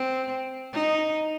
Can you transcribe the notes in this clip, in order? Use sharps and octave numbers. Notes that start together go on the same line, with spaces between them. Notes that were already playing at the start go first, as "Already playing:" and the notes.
Already playing: C4
D#4